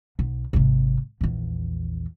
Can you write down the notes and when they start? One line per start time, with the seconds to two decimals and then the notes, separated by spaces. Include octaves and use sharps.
0.19 B1
0.53 G#1 C3
1.21 A#1 E2